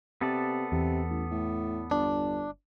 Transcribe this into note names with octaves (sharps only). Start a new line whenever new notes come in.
C3 B3 A4 D5
E2 C3
A1
A2
G1 D4